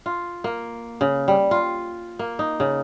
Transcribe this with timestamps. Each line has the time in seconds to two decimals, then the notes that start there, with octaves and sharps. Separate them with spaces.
0.06 F4
0.44 A#3
1.01 C#3
1.28 G3
1.51 F4
2.19 A#3
2.39 D#4
2.60 C#3